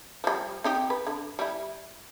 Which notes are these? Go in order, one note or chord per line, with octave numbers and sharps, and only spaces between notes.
F3 G3
C4 D#4 G4
B4
D3
G3 E4